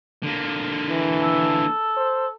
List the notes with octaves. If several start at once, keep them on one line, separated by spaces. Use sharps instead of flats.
D3 A#3
E3
A4
C5